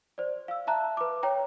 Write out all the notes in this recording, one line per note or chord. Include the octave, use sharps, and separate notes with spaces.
C5 D5
F5 E6
E5 A5 A#5 F#6
B4 D6
C#5 G5 A#5